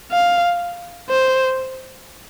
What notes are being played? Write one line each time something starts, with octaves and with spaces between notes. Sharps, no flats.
F5
C5